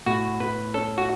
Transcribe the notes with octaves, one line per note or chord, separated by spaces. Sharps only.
A2 F#4
A2 B4
C#4 A4
F#4